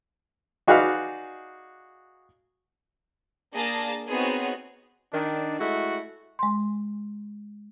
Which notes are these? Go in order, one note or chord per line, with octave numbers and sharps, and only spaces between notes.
D#4 F#4 G#4 B4 D5 F5
A#3 D4 G#4 A5 A6 A#6
B3 C4 D#4 F#4 G#4 C#5
D#3 D4
G#3 A3 E4 F#4
G#3 C6